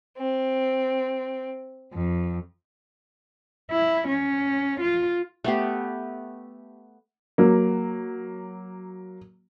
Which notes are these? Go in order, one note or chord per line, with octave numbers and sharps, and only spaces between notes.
C4
F2
E4
C#4
F4
A3 B3 G4
F#3 A#3